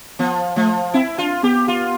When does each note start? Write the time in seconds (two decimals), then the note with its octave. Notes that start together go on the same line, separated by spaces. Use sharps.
0.19 F3 B3
0.56 F3 A3
0.94 C4 E4
1.18 D4 F4
1.43 B3 G4
1.68 F4